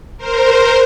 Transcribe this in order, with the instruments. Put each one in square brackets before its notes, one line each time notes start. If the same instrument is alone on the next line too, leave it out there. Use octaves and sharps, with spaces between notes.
[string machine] A#4 C5